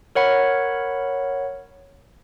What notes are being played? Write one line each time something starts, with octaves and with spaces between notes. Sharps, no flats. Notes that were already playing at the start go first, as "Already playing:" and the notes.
A#4 C#5 F#5 B5